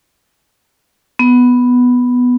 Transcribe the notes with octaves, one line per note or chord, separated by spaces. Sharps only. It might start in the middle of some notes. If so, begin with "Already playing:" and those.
B3